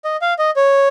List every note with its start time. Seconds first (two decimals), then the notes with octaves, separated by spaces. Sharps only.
0.05 D#5
0.22 F5
0.39 D#5
0.56 C#5